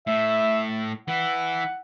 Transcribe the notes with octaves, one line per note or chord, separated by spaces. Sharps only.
A2 E5
E3 E4 F#5